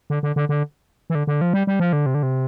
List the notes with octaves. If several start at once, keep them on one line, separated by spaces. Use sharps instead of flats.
D3
D3
D3
D3
E3
D3
D3
F3
G3
G3
F3
D3
C3
D3
C3